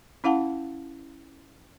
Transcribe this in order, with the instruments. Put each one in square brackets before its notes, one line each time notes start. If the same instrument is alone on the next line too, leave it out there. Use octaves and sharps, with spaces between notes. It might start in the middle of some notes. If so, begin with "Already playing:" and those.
[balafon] C#4 E4 F5 F#5 A5